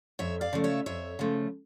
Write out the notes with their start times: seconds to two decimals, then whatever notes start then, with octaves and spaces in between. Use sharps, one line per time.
0.19 F2 C#5 E5
0.41 D5 F5
0.53 C#3 F3 A3
0.64 C#5 E5
0.86 F2 C#5 E5
1.19 C#3 F3 A3